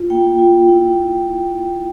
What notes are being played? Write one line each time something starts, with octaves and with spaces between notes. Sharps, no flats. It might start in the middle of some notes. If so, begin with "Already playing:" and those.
Already playing: F4
A#3 G5
F4
E4